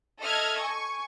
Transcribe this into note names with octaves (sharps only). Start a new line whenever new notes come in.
A4 D#5 E5 F6 G#6
G#5 C#6